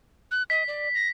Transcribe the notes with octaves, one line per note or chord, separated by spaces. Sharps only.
F#6
D#5 B6
D5
A#6